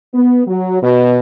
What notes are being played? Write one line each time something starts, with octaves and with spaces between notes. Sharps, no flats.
B3
F#3
B2